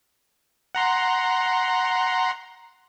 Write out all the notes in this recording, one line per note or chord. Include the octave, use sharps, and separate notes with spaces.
F#5 A#5 C6